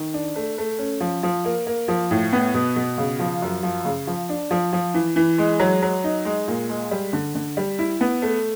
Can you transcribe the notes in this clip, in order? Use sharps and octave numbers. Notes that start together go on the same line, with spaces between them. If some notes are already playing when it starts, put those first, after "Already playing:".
Already playing: D#3
D4
A3
A3
C#4
F3
F3
A#3
A#3
F3
A2
B3
B2
B2
C#3
F3
F#2
F3
C#3
F3
D4
F3
F3
E3
E3
G#3
F#3
F#3
D#4
G#3
A#2
G#3
G3
D3
D3
G3
E4
B3
A3